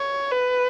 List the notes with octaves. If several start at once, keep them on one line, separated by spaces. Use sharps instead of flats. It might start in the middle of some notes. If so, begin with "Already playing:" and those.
Already playing: C#5
B4